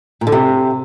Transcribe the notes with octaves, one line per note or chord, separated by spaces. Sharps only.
A#2
D3
C3